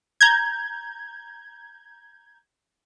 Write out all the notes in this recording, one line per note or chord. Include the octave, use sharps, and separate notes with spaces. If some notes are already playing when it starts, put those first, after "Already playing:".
A#5 G6 G#6